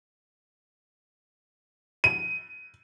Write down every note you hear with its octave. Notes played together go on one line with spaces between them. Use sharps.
D#7